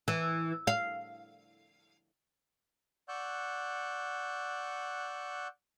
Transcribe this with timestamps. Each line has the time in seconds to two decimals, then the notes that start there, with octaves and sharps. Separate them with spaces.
0.08 E3
0.67 F5
3.09 D5 F#5 C#6 E6 F#6 G6